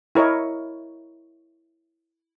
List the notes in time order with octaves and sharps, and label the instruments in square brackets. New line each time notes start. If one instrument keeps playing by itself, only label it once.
[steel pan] E4 A#4 C#5 D#5